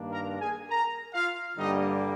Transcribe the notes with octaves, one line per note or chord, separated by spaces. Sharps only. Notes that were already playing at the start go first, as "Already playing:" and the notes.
Already playing: G2 D#3 A#3 D4
A#4 A#5
G#4 G#5
A#4 A#5
F4 F5
G2 D3 G3 A#3 D#4 D#5